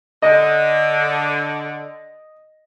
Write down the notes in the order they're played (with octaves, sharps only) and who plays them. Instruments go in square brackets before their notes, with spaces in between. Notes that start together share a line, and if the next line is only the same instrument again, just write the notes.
[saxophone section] D3 [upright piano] D#5